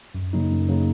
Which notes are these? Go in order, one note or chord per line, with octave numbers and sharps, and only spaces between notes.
F#2
C#3 F#3 A#3 D#4
F#2
C#3 F#3 A#3 D#4